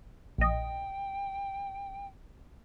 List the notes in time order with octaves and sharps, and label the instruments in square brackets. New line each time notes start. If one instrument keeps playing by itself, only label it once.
[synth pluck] A#1 D#5 [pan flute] G5